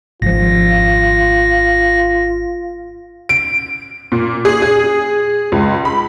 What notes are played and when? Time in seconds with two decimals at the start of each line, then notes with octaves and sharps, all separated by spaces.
0.22 G#1 F3 F4 A#6
3.29 D7
4.12 A#2
4.45 G#4
4.62 G#4
5.52 C#2
5.85 B5